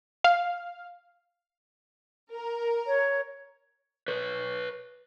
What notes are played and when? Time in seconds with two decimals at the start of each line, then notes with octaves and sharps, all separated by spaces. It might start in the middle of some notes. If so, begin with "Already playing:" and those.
0.24 F5
2.35 A#4
2.87 C#5
4.08 B4 C#5